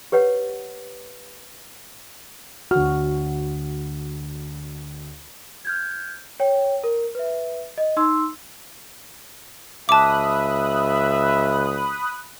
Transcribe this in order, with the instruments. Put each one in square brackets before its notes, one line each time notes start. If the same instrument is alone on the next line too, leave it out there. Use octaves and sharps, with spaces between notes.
[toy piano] G4 B4 C#5 F#5
[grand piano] D2 F6 [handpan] F#4
[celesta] F6 G6 G#6
C#5 G5
A#4
B4 E5
D#5
D#4 C6 E6
[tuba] C#2 [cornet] E5 [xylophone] A5 D6 [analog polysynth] B5 D#6 F#6